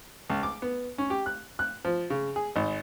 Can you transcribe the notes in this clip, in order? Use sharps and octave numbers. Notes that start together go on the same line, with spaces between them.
C#2
D6
B3
C#4
G4
F#6
F#6
F3
C#3
G#4
G#1